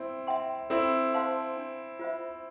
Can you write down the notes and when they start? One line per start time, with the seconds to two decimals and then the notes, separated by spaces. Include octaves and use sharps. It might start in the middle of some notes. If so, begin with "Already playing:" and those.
Already playing: C4 E4
0.27 E5 G5 C6
0.70 C4 E4 A4
1.14 C5 F5 A5 C6
1.57 D4
1.99 F4 C5 E5